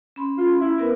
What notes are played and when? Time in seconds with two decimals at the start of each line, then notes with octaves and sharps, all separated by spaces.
0.16 C#4 B5 C6
0.38 F4
0.61 E4
0.78 B3 A#4 B4